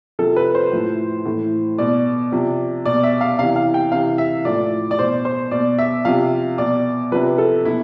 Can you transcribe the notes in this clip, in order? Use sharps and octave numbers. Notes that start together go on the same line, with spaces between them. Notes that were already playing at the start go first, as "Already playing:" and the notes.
C3 F3 A4
B4
C5
A2 F3
A2 E3
B2 D5
C3 F3
B2 D5
E5
F5
C3 E3 F5
F5
G5
C3 E3 F5
E5
A2 F3 D5
D5
B2 C5
C5
B2 D5
E5
C3 F3 F5
B2 D5
C3 F3 B4
A4
B2 E4